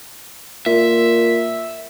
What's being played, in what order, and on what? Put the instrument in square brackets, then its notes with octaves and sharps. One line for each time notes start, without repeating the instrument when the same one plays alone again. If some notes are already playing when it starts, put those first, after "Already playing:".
[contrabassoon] A#2 [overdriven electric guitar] E5